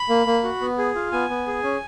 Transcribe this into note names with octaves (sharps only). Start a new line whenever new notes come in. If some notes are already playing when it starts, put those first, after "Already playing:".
Already playing: B5
A#3
A#3
F#4
B3
G#4
F4
B3 G#5
B3
G#4
C#4